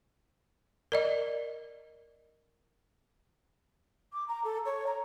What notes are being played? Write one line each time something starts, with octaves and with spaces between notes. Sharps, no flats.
A#4 D5 D#5
D6
A#5
A4
C#5
A#5